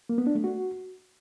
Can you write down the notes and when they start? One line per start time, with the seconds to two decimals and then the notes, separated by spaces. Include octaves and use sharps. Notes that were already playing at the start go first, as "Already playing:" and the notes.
0.09 A#3
0.18 B3
0.27 D4
0.35 A3
0.44 F#4